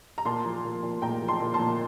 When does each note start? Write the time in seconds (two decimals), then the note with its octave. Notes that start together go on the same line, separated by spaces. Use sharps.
0.18 A#5
0.25 A#2 A5 C6
0.45 F3
0.65 A#2
0.83 A#2
1.02 A#2 G5 A#5
1.22 F3
1.28 A5 C6
1.40 A#2
1.54 A5 C6
1.59 A#2